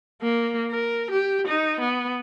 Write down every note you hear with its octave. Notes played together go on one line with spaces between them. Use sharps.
A#3
A#4
G4
D#4
B3